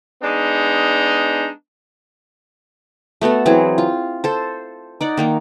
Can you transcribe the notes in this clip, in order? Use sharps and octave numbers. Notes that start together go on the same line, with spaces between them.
G#3 B3 D4 D#4
A3 B3 F#4 A4
E3 F#3 C4 G#4
F4
A4 C5
D#4 D5 F#5
D#3 A#3 D#4